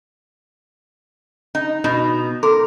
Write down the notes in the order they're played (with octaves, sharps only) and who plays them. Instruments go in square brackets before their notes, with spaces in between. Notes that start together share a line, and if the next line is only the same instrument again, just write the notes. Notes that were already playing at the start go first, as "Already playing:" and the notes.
[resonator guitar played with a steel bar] D#4
B2 D#4
[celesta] A4 C6 D6 [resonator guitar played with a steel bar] A#4